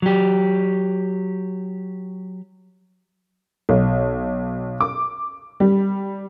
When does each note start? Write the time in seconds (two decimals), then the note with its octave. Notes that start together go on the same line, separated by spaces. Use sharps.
0.02 F#3 G4
3.69 B1
4.81 D6
5.60 G3